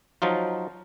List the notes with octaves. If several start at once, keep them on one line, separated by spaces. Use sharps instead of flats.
F3 F#3 D#4 F4